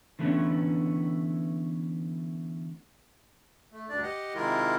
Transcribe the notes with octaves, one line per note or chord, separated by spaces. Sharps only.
D3 E3 A3 B3 C#4
A3
D2 G2 D4 D5
G4 D#5 F#5
C3 D#3 G#3 E4 F4 A#4